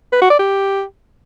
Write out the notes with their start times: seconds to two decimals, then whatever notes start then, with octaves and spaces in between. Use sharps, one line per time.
0.13 B4
0.21 F#4
0.30 D5
0.39 G4